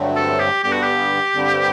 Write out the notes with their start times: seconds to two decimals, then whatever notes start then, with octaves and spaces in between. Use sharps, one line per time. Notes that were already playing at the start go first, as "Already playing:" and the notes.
Already playing: G2 D3 F#3 A3 C4
0.16 A4
0.40 G4
0.63 G2 D3 G3 B3 G4
0.73 F#4
0.83 G4
1.33 G2 D3 G3 C4